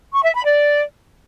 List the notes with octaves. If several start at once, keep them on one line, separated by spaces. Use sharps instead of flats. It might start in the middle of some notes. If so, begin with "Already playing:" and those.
C#6
E5
B5
D5